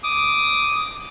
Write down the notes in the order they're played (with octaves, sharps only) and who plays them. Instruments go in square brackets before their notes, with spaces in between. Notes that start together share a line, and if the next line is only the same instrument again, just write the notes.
[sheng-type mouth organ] D6 D#6